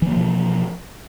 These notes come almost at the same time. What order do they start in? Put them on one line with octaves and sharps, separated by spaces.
E3 A#3 F3 B2